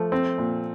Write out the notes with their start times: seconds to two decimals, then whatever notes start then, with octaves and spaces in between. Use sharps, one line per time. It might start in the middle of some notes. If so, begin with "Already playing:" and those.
Already playing: F3 A3
0.12 C4
0.38 A#2